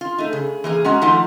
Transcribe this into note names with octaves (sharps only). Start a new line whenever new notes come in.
F4
A3 D#4
C#3 G#4
E3 A#3 G#4
G#3 C#4 F#4 F#5 A#5
D#3 F3 A3 D#4 F4 F#5